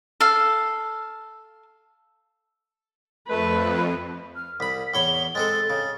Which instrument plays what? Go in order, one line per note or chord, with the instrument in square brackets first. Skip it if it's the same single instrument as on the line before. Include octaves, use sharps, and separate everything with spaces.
[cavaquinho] A4 F5
[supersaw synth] F2 [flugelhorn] A3 [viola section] B4
[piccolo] F6
[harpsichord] C2 B5 [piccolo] B6
[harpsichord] E2 C#5 B5 [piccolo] G7
[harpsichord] G#3 C4 A4 [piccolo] A6
[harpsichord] C#3